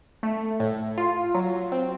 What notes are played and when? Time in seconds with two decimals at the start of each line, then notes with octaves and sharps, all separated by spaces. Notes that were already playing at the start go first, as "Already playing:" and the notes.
0.23 A3
0.60 A2
0.98 F4
1.34 F#3
1.72 C4